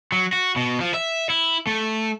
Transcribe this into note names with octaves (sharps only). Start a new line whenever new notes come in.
F#3
F#4
B2
F3
E5
E4
A3